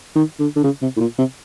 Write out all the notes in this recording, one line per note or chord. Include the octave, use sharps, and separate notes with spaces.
D#3
D3
D3
C#3
C3
A2
A#2
C3